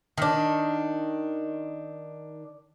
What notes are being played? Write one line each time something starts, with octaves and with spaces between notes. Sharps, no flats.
D#3 D4